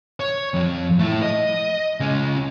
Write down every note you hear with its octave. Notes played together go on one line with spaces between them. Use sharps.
C#5
F2 F3
A3 E4
D#5
C#2 C#4